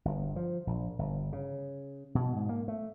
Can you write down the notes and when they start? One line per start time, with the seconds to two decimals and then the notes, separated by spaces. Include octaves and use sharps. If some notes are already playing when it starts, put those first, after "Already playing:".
0.05 G1
0.36 F3
0.67 A#1
0.99 G1
1.33 C#3
2.15 B2
2.36 G#2
2.49 A#3
2.68 A3